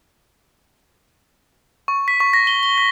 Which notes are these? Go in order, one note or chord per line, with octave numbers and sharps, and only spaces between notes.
C#6
B6
C#6
A#6
G7
G7
B6